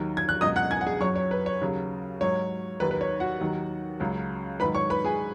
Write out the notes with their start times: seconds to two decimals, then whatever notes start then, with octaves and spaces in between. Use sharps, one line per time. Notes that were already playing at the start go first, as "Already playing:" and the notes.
Already playing: D#2 D#3 F#3
0.17 G#6
0.29 F#6
0.41 C#2 B2 F#3 D#5 D#6
0.56 F#5 F#6
0.71 G#5 G#6
0.81 F#5
0.86 G#4 G#5
1.01 F#2 F#3 C#5 C#6
1.16 C#5
1.31 B4
1.46 C#5
1.61 D#2 C#3 F#3
2.21 G#2 F#3 C#5
2.80 D#2 D#3 F#3 B4
2.91 B4
3.01 C#5
3.20 F#4 F#5
3.41 D#2 D#3 F#3
4.00 C#2 C#3 F#3
4.60 G#2 D#3 F#3 B4 B5
4.75 C#5 C#6
4.90 B4 B5
5.04 G#4 G#5